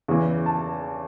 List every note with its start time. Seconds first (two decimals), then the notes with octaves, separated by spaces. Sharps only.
0.08 E2 C#3 E3
0.46 A5